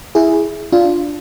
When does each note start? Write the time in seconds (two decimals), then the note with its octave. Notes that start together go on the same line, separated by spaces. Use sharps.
0.15 E4 G#4
0.72 D4 F4